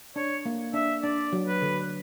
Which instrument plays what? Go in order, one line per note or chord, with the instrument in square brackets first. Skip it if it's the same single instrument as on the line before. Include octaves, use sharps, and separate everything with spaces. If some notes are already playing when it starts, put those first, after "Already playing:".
[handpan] D4 [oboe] C#5
[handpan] A#3
[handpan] D4 [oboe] E5
[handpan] D4 [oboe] D5
[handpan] F#3
[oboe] B4
[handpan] D3